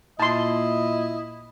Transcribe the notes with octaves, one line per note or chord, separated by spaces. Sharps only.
A#2 E4 D#5 A5 C6